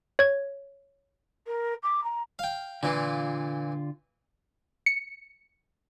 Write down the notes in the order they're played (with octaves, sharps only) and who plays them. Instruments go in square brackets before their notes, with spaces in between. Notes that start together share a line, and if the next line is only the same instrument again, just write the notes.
[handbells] C#5 G#6
[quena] A#4
D6
A#5
[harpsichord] F5 G5
[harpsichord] A#2 E3 [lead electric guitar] D3 F4
[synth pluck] C#7